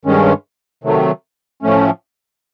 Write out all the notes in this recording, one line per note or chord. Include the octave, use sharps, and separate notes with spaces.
G2 D#3 G#3 C#4
C3 D#3 F#3 A3
A2 F3 A3 C#4